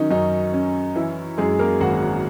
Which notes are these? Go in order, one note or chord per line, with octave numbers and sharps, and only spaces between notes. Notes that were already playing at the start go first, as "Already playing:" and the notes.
Already playing: D#3 F#3 C#4 D#4
F#2 D#4
C#4
E3 E4
F#2 G#3 G#4
A#3 A#4
G#1 F#4 F#5